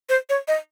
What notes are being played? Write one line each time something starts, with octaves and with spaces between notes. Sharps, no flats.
C5
C#5
D#5